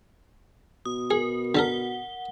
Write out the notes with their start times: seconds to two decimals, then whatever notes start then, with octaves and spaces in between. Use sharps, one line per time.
0.85 B2 D#6
1.11 G#4 A#4
1.55 D3 A4 A#4 F#5 G7